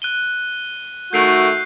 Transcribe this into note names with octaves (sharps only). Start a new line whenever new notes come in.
F#6 D#7 G7
D#3 A3 F#4 G6 C7